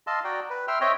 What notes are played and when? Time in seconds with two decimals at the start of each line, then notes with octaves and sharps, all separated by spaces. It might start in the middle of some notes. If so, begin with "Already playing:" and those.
0.07 D#5 F5 A5 C6 E6
0.24 F#4 D5 G5 A#5
0.50 B4
0.68 E5 G5 C6 E6 F6
0.81 C4 C#5 D#5 E5 G5